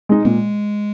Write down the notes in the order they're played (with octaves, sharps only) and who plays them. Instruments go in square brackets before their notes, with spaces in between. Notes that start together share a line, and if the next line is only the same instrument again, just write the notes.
[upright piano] G#3 D#4
[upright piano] A#2 [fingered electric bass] G#3